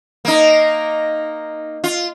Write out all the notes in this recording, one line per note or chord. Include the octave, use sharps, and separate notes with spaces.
A#3 D#4
F4